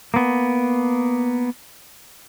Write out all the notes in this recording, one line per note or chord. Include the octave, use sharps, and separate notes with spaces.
A#3 B3